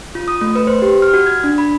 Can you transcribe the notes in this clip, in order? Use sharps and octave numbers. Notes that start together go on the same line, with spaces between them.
F4
D#6
A3
B4
C5
G4
F6
F#4
G#6
D4
B5